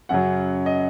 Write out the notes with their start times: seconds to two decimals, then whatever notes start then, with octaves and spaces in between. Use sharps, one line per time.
0.09 F#2 C#3 F#3 F#5
0.66 D#5